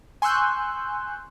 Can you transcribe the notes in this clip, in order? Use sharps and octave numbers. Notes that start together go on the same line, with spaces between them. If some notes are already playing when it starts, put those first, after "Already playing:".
G#5 C6 C#6 E6 F#6 G6